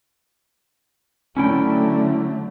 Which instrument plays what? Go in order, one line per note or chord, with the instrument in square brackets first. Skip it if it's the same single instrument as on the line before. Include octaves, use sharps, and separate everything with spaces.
[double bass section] D3 F#3 A3 [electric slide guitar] C#4 E4 G5